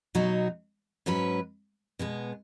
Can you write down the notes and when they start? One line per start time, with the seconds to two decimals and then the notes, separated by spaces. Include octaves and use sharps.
0.15 B2 F#3 D#4 F#4
1.06 G#2 F#3 C#4 B4
1.99 B2 G#3 B3